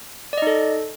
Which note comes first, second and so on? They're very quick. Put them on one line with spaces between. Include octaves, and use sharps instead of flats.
D5 D#5 D#4 A4